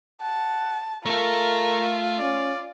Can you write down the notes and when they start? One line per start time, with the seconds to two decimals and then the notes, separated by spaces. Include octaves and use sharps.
0.21 F#5 A5
1.06 A3 F4 A4 A#4 A#5
2.19 C#4 D5